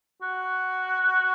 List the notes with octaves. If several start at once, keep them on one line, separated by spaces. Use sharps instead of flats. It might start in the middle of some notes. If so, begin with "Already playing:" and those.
F#4